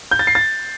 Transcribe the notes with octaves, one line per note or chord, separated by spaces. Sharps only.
G6
A6
C7
A6